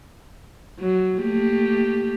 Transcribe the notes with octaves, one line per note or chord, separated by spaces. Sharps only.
F#3
A3 A#3 G4